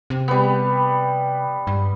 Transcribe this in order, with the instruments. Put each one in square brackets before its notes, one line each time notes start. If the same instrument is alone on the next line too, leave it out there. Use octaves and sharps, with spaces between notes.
[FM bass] C3
[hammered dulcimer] G3 B3
[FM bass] G2